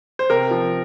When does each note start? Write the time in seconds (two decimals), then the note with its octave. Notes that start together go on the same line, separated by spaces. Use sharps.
0.19 C5
0.30 C3 A#4
0.51 F3